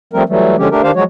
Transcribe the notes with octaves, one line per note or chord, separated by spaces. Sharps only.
F3 G3 A3 C4 A#4
E3 F#3 G3 A3
D3 F3 G#3 C#4 G4
A3 D4 G4 A#4
D#3 D4 G4 C5 F5
F3 F#3 G#3 F#4 C#5